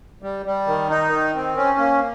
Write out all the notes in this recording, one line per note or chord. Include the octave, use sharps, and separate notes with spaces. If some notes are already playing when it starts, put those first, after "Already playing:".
G3
G3
D#3
D#4
D#3
C4
C#4
A#3